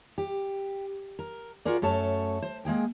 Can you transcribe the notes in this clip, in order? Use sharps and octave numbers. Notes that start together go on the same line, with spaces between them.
G4
A#4
F4 F#4 G#4 A#4 D5
F#2 A3 A4 C#5 A5
C5
G#3 A#3 G#4 G5